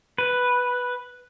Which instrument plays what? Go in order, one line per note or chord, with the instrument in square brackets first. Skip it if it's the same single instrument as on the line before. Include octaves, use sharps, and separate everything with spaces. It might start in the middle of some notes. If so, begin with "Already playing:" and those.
[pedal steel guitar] B4